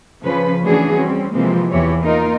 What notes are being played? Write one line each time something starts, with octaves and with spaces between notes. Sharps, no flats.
C#3 F3 C#4 B4
E3 A3 C#4 D4 F#4 G#4
G3 C4 C#4
C3 E3 F3 G#3 A#3 C4
E2 E3 G4 C#5
A#3 D#4 F4 A#4